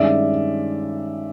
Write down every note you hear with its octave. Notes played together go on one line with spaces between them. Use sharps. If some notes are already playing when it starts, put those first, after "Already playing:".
Already playing: G2 D#3 G#3 C#4 D5 E5